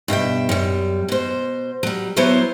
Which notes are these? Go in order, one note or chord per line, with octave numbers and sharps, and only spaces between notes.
G2 B2 E5 G5
F#2 G3
B2 C5
F#3 G3
F#3 B3 E4 C5 C#5